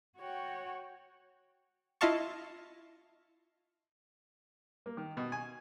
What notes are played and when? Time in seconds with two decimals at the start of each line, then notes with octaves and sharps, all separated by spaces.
0.18 F#4 C#5 F#5 G5
2.01 E4 F4 D#5 F5 A5 C#6
4.86 A#3
4.97 D#3
5.17 B2
5.32 G#5